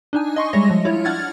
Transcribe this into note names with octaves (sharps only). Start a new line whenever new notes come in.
D4 D#4 G#5
D#5 C6 C#6
G3 G#3 C#5 E5 A#6
F3
E4 F4 C#5
D4 F#5 F6 G#6 A6